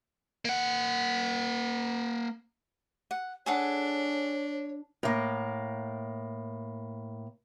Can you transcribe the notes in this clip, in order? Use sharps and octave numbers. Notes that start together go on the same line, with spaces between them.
A#3 F#5
F#5
D4 G#4 A4 C#5 F#5
A2 A#3